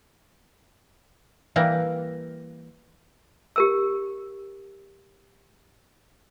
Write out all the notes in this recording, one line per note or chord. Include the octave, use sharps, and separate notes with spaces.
E3 G3 A#3
G4 A#4 E6